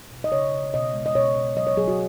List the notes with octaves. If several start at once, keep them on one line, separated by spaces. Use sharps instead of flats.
B2
D#5
C#3 C#5
C#3
B2 D#5
G#3
D#5
B2 C#5
B2
F#3 D#5
C#5
F#3 G#4
F#4